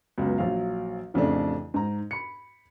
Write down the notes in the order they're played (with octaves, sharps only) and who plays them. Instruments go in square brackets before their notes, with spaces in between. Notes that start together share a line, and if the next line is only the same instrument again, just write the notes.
[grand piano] C#2 F#2 B3
A#1 F#3 F5
A1 F2 C#3 A3 D4
G#2 A#5
B5 C#7